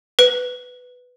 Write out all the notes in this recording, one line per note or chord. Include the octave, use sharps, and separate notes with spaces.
B4